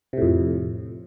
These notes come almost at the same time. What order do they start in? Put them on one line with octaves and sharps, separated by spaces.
C3 A2 F2